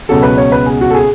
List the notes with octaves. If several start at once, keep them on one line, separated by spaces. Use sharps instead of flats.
C#2 B2 F#3 A4
B4
C#5
B4
G#4
F#4
A4
G#4